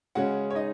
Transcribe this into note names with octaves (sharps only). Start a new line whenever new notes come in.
C#3 G#3 C#4 F#4 F#5
C#5
D#4 D#5